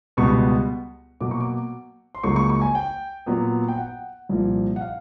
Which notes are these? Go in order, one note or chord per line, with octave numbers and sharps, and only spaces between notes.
C#2 B2 G3 B3 C#6
B2 F#3 A#3 D6
C#6
D6
C6
C#2 C#3 F#3 A#3 C#6
C#6
C#6
G#5
G5
A#2 F#3 B3
G5
F#5
C2 A#2 F3
F#5
F5